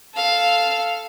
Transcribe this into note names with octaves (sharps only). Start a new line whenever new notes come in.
A4 F5